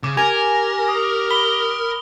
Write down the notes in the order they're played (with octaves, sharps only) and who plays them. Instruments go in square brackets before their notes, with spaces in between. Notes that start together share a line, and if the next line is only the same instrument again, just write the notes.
[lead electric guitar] C#3 [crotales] D6
[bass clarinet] G4 [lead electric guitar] A#4 [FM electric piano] G#5 [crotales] F7
[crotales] D#6
[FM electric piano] B5 [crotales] G7